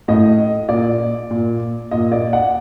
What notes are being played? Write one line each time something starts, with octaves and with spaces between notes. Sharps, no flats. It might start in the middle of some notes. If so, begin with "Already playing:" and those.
A2 D#5
A#2 D5
A#2
A#2 D#5
D5
F#5